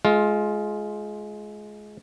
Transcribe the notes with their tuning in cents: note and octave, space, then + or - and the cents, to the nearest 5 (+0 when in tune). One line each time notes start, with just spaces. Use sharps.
G#3 +20 F4 +0